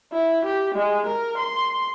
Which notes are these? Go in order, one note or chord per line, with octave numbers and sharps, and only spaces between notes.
E4
G4
G#3
A#4
C6